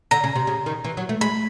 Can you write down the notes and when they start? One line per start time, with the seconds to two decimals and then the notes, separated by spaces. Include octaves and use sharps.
0.11 D3 A#5
0.24 C#3
0.36 C3
0.47 C#3
0.66 D#3
0.84 E3
0.97 F#3
1.09 A3
1.21 G#3 B5